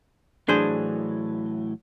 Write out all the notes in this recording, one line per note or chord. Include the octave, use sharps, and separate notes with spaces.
A2 E3 F#3 D4 G#4 C5